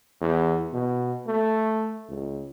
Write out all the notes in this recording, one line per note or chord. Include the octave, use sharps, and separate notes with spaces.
E2
B2
A3
C#2